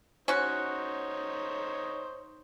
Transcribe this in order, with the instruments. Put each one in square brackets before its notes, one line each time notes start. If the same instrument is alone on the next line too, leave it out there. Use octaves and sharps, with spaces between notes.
[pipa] C#4 F#4 [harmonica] D#4 C5 C#5